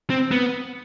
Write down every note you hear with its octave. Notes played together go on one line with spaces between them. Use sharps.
C4
B3